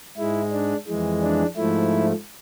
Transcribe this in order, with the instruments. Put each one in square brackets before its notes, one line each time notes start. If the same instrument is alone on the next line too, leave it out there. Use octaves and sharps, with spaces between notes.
[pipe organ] G#2 G#3 E4
D4
F2 E3 G#3
D4
G#2 F3 A3 E4